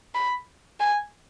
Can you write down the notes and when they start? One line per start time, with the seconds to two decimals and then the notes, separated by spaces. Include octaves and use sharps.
0.15 B5
0.80 G#5